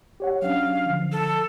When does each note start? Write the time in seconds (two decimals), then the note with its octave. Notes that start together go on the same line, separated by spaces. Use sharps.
0.20 G4 C#5 F#5
0.42 F#3 C#4 D4 F5
0.86 D3 F3
1.12 A4